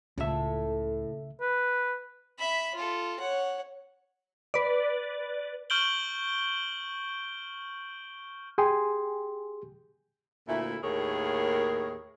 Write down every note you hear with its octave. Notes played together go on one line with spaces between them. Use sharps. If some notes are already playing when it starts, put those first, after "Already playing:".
C#2 A2 C#3 A4 E5
B4
E5 B5
F4 A4
C#5 F#5
B4 D5
C#6 F6 G6 D7 F#7 G7
G4 G#4 G5 G#5 C6 D#6
D2 A#2 A3 E4
D#2 A2 A#3 G#4 A#4 C#5